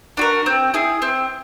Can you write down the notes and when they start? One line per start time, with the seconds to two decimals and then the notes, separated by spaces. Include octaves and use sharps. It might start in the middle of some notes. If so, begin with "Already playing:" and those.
0.17 D4 F#4 A#4
0.46 C4
0.74 E4 G#4
1.02 C4